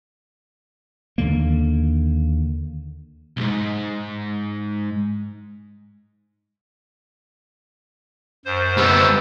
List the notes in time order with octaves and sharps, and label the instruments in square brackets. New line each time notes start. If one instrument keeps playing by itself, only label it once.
[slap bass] D#2 D3 A#3
[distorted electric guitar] B1 G#2
[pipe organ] F#2 C5
[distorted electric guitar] G3 B3 [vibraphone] E6